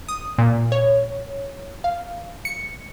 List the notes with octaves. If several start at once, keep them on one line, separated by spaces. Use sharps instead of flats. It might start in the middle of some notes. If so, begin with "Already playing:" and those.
D#6
A#2
C#5
F5
C#7